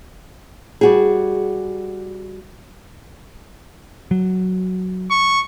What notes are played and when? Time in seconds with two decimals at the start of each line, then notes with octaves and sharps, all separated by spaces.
0.81 G3 F#4 G#4
4.11 F#3
5.11 C#6